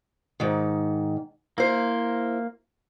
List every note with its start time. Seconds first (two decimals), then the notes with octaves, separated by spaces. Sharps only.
0.40 G#2 D#3
1.58 A#3 E4 C5